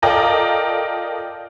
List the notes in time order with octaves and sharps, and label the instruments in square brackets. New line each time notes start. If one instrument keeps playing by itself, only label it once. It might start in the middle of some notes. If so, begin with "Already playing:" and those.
[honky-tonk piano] F4 A4 A#4 D5 D#5 G5